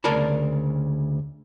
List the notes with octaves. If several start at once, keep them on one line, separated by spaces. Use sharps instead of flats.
D2 C#3 A#4 D5 A5 B5